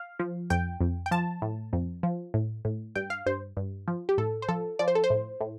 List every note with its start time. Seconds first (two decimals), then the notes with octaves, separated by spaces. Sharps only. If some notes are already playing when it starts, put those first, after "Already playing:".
Already playing: F5
0.19 F3
0.50 F2 G5
0.81 F2
1.06 G5
1.11 F3 A5
1.42 A2
1.73 F2
2.03 F3
2.34 A2
2.65 A2
2.95 G2 G5
3.10 F5
3.26 G2 C5
3.57 G2
3.88 F3
4.09 G4
4.18 A2 A4
4.42 C5
4.49 F3 A4
4.79 F3 D5
4.88 C5
4.95 A4
5.04 C5
5.10 A2
5.41 A2